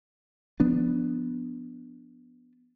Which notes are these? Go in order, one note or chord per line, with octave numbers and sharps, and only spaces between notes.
F3 B3 D4